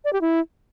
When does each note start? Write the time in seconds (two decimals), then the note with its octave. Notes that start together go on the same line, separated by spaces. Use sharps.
0.05 D5
0.13 G4
0.21 E4